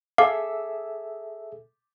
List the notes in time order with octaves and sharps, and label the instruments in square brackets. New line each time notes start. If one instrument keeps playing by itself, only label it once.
[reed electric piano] G#4 A4 E5 [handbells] F5 [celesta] D6